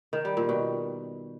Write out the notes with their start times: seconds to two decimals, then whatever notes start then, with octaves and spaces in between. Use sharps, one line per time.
0.13 D#3
0.25 G3
0.37 A#2
0.49 B2